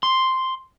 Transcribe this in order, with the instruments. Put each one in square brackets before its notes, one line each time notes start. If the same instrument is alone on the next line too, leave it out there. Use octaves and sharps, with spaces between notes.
[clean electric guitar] C6